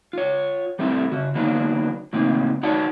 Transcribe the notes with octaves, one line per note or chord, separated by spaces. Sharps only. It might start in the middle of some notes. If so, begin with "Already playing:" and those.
F4 C#5
G3 A3 C4 E4
C#3 F#4
D3 F#3 A#3 B3 D4 D#4
A2 C#3 A#3 C4 D#4
D#4 F#4 C#5 D5 F#5 A5